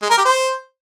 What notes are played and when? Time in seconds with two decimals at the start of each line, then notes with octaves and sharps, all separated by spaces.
0.02 G#3
0.10 A#4
0.18 G4
0.25 C5